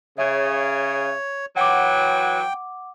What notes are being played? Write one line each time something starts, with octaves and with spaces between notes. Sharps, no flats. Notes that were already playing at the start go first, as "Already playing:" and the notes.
C#3 C#5 E5
E3 F#3 F#5 G5 D6